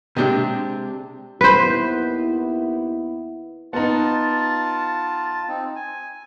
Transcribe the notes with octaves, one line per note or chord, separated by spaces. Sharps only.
C3 G#3 C4 D4 G4
D#2 B3 E4 B4 C5
B3 D#4 F4 A5
C4 D#4
G#5